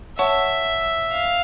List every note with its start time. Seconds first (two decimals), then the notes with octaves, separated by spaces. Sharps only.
0.19 C#5 E5 F#5 A5 C#6
1.12 F5